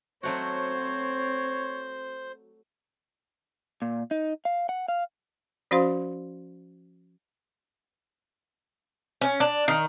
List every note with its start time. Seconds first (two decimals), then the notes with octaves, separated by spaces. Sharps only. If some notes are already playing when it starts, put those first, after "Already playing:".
0.23 F#3 A3 C4 F#4 C5 C#5
3.82 A#2
4.11 D#4
4.45 F5
4.69 F#5
4.88 F5
5.71 F3 C#4 F#4 C5 F5 C6
9.21 C#4
9.40 D4
9.68 D#3